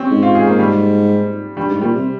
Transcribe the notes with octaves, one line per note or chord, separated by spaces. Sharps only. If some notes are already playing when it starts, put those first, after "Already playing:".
Already playing: C4 C#4
G#2
F4
G#4
A#3
G3
G2 G3
G#2
A#2 G3
C3